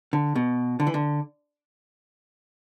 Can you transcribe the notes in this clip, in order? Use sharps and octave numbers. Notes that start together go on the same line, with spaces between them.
D3
B2
D3
E3
D3